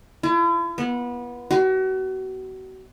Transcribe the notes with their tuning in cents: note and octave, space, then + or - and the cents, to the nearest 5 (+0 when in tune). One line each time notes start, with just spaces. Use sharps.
E4 +45
B3 -25
F#4 +35